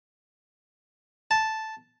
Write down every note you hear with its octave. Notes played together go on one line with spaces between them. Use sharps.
A5